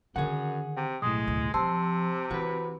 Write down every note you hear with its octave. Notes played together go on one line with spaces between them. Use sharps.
F#2 D3 D#3 G#4 F#5
C3 G5
B1 A2 G#3 D#6
D2
C3 F3 C5 A5 C6 E6
E3 F#4 B4